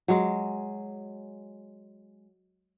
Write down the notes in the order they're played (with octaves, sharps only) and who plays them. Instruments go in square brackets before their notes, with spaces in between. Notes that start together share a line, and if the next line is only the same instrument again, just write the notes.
[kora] F#3 G#3